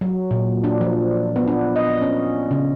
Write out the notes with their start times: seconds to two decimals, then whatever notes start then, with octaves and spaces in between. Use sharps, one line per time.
0.01 F#3
0.31 A#2
0.64 D4
0.81 F3
1.36 B3
1.48 D4
1.76 D#5
2.02 C#4
2.51 C#3